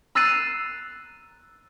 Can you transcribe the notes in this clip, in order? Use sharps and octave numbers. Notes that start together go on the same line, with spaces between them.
A#5 E6 F#6 A6 C7 D#7